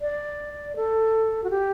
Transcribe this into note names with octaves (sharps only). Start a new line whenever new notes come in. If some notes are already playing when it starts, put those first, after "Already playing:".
D5
A4
F#4
G4